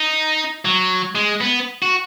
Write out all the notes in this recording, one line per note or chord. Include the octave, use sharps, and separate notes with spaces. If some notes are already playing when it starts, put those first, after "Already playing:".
Already playing: D#4
F#3
G#3
B3
F#4